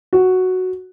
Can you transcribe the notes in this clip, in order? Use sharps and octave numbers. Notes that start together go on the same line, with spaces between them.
F#4